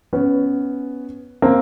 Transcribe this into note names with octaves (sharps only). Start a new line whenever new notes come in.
B3 C#4
A#3 C4